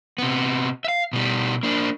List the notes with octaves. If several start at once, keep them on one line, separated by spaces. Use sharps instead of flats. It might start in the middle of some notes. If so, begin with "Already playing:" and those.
C3 B3
E5 F5
B2 G3
A#3 D4